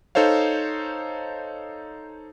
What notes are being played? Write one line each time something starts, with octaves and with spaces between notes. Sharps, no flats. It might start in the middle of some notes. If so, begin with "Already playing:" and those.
D#4 A4 C5 C#5 F5